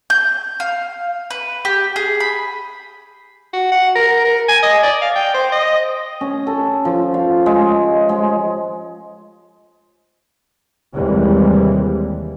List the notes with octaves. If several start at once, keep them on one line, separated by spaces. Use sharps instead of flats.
G6
F5
B4
G4
G#4
B5
F#4
F#5
A#4
A#4
G#5
D#5
D5
F5
G5
C5
D#5
C#4
A4
F3
F5
G#3
G#3
D#2 C3 E3 G3 G#3